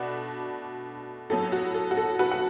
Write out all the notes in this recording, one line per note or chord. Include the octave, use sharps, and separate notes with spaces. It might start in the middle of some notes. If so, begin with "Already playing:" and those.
Already playing: B2 A3 D4 F#4 B4
A2 F#3 B3 A4
F#4
A4
F#4
A4
F#4 B4
F#5